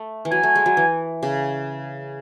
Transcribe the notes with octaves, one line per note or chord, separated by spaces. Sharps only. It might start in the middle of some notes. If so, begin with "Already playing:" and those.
Already playing: A3
E3
F#3 G#5
A3
G#3
F#3
E3
C#3